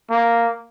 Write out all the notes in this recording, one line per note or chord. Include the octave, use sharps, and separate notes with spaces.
A#3